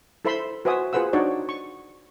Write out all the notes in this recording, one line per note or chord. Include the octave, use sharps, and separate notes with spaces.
E4 A4 C5 E5 B5 C6
F#4 B4 C5 E5 G#5 D#6
F4 G#4 B4 C5 F#5 E6
D4 D#4 F#4 C#5 D5
C#6